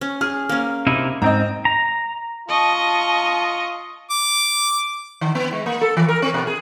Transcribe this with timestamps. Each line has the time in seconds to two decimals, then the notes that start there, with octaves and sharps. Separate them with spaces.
0.01 C#4
0.21 G#4 F6
0.49 A#3 C#4
0.87 C3 D#4 E4
1.22 G#2 C4 D#5 A#5
1.65 A#5
2.48 F4 D#5 A5 C#6
4.10 D6
5.21 D#3
5.35 B3
5.53 G#3
5.66 A#3
5.81 A4
5.97 E3
6.09 A#4
6.22 C4
6.34 B2
6.47 G#4